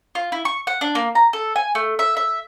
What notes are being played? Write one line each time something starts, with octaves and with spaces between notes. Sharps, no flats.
F4
E4
C#6
F#5
D4
A#3
A#5
A4
G#5
A3
E5
E5